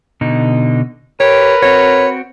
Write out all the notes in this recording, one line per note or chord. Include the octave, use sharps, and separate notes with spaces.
B2 D3 D#4
G4 A#4 B4 C#5
C4 F#4 C#5